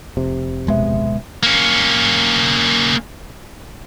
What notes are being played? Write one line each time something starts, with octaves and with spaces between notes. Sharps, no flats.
F1 C3
D1 B2 G#3 B3 E5
A#3 C#4